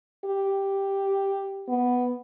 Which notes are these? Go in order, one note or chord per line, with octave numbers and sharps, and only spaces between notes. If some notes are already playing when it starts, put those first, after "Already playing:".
G4
B3